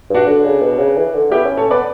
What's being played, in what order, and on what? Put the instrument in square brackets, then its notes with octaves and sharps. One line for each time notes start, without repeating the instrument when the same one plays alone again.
[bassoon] G2 [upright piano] D4 F#4
[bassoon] D3
C#3
B2
C#3
E3
D3
[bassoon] B3 [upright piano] E4 G4
[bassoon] C#4
[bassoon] C#4 [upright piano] A4 C#5
[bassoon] B3 [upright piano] B4 D5